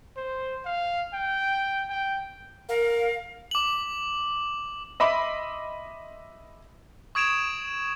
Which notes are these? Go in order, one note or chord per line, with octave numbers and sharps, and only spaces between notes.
C5
F5
G5
G5
A#4 F5
D6 F#7
D#5 E5 B5 C6 D6
C#6 D#6 G#6 D7 E7 F7